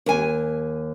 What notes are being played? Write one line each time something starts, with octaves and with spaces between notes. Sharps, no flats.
D#2 G#5